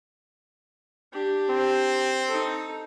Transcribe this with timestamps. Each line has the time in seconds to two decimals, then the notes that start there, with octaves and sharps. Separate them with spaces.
1.13 D4 G4
1.50 C4
2.27 D#4 A4